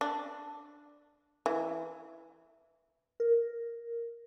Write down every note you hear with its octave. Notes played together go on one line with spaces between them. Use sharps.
D4
E3
A#4